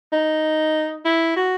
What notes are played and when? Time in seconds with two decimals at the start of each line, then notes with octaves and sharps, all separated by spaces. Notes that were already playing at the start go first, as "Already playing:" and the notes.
0.12 D#4
1.05 E4
1.36 F#4